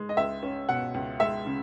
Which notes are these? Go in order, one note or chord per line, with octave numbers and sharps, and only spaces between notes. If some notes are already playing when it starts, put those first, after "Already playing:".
Already playing: G#3
D#5
C#2 E5
C#4
B2 F#5
C#2
G#3 E5
C#3